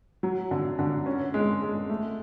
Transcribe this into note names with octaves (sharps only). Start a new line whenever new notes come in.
F#3
D3
D3
C#4
G#3
G#3
A3